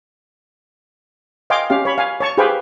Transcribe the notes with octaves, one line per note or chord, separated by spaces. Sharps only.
D#5 F5 G5 G#5 C6 D6
C#4 G4 F5
C#5 B5
F5 G#5
C#5 A5 C#6
G4 G#4 B4 C5 F5 G5